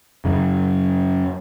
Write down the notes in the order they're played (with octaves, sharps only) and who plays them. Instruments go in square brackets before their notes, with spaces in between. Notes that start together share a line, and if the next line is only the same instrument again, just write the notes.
[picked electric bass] F#2 C#3